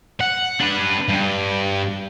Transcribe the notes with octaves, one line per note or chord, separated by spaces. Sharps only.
F#5
D4 B4
G2